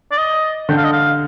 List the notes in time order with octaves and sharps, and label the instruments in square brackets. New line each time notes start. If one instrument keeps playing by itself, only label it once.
[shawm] D5
D#5
[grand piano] D3 [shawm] G5
[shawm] F5
D#5
F5